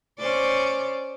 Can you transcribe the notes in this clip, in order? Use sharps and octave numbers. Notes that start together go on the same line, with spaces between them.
C#4 C5 D5